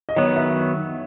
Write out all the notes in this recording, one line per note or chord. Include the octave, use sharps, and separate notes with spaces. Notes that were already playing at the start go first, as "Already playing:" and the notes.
D#5
D#3 F#3 B3 C#5
E5